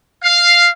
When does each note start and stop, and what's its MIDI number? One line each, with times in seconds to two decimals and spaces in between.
0.24 0.70 77